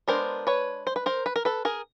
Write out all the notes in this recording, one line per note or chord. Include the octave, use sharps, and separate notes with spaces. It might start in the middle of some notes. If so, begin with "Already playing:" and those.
G#3 B3 D4 A#4 C5
B4 C#5
C5
B4
A#4 C5
B4
A#4
A4 B4
G#4 A#4